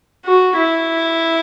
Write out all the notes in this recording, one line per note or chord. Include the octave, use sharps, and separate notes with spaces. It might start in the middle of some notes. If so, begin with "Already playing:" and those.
F#4
E4